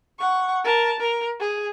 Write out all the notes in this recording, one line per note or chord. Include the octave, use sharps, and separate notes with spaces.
F#5 C#6
A#4 A5
A#4
G#4